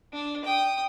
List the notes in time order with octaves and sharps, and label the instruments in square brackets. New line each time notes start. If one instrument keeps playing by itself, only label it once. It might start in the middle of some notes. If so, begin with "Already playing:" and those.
[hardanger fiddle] D4
G5 D#6